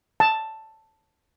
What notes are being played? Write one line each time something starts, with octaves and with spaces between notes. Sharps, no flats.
A5